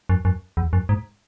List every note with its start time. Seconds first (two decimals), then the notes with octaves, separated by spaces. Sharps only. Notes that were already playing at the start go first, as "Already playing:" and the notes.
0.09 F#2
0.25 F#2
0.57 E2
0.73 F#2
0.89 G#2